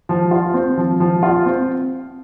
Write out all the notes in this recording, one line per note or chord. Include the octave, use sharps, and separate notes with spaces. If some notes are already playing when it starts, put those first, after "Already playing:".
F3
F4
C4
F3
F3
F4
C4